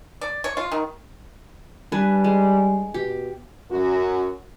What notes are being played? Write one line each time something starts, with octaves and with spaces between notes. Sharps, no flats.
D5
C#5
F4
D#3
G3 D4 B4 G#5
G#3
B2 G4
F#2 F#4